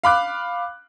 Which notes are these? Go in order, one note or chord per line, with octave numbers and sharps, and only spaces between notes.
F5 B5 D6 F#6